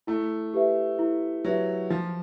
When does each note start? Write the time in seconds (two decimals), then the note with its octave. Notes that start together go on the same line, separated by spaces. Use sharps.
0.07 A3 E4
0.54 G4 B4 E5
0.99 E4
1.45 F#3 G4 B4 E5
1.90 F3 F4